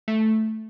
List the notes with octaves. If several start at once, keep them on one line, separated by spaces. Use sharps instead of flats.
A3